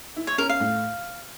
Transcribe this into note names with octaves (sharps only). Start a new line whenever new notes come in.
E4
C#5
C#4 A#4
F5
A2